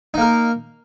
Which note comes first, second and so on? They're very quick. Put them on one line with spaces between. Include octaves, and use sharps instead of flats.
D#4 A#3 A#4